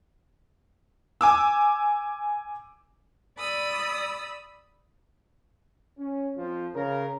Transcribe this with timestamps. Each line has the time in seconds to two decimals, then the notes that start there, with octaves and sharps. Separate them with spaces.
1.21 G#5 D6 E6
3.38 D5 B5 D#6 E6
5.98 C#4
6.36 F2 F3
6.74 C#3 A#4